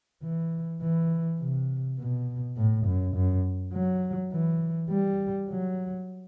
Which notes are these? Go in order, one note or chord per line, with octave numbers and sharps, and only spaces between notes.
E3
E3
C3
B2
A2
F#2
F#2
F#3
E3
G3
F#3